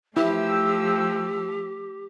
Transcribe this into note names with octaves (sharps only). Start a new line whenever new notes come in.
F3 A3 E4 G4 G5 E6